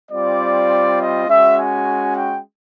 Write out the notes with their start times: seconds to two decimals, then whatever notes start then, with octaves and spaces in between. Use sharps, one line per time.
0.11 G3 C4 F4 D5
0.99 D#5
1.27 G#3 C#4 F#4 E5
1.57 G#5
2.15 G5